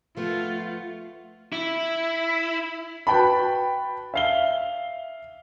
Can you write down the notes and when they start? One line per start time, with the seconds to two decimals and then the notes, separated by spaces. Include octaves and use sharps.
0.17 F3 A3 B3 F4
1.53 E4
3.07 F#4 B4 G5 A5 B5
4.14 E5 F5 G7